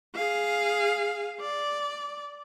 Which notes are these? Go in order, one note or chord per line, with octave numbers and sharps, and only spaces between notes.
G#4 F5
D5